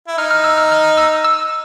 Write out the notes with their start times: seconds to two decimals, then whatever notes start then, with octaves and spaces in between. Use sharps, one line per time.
0.08 E4
0.18 D#4 F6
0.31 F6
0.44 E6
0.58 F6
0.72 F6
0.97 E6
1.24 E6